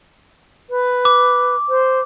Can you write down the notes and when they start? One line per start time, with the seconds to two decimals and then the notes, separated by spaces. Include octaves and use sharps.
0.70 B4
1.05 D6
1.69 C5